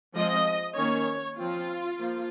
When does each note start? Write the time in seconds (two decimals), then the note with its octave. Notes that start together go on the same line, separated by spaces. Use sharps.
0.15 F3 G#3 C4 D#5
0.76 D#3 A#3 C#4 C#5
1.37 F3 C4 F4
1.98 F3 A#3